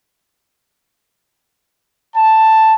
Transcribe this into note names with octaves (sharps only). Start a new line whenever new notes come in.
A5